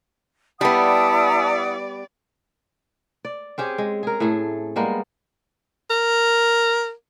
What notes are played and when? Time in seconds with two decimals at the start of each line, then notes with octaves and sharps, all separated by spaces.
0.61 G3 B3 E4 D5 F#5 A5 D#6
3.25 D5
3.58 C4 C#4 G4 G#4
3.78 G#3
4.03 G#4 A#4
4.20 A2 A3 G#4
4.76 G3 G#3 A#3 B3
5.90 A#4